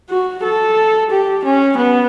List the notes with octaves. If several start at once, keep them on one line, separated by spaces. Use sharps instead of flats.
F#4
A4
G4
C#4
B3